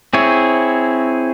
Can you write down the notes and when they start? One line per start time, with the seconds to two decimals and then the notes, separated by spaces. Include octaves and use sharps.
0.13 C4 E4 G#4 C#5